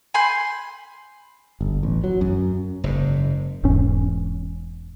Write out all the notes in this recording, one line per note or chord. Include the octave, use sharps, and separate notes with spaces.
G#5 B5 C6 G6
G1
A1
F#3
F#2
F#1 G#2
E1 E2 G#2 C#4